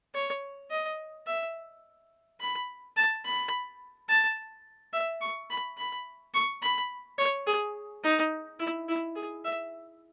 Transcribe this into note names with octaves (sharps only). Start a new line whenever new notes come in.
C#5
D#5
E5
B5
A5
B5
A5
E5
C#6
B5
B5
C#6
B5
C#5
G#4
D#4
E4
E4
G#4
E5